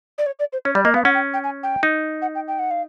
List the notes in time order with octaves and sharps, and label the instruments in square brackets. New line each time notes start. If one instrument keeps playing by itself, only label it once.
[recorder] D5
C#5
D5
C5
[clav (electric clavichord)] C#4 [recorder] C#5
[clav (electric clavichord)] G3 [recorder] D5
[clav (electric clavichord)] A#3 [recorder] D#5
[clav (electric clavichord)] B3 [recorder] F5
[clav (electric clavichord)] C#4 [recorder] F#5
[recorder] G5
G5
G#5
G5
[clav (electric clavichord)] D#4
[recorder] F#5
G5
G5
F#5
F5